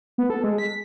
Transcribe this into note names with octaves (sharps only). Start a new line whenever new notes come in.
B3
A4
G#3
B6